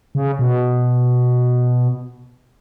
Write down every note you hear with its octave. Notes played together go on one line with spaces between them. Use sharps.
C#3
B2